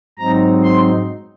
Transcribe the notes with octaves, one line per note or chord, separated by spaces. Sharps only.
G#2 F#3 C4 D#4 A#5
C6